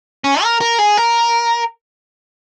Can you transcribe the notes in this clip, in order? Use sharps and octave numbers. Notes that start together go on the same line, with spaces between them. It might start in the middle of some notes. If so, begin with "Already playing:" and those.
C#4
A#4
A#4
G#4
A#4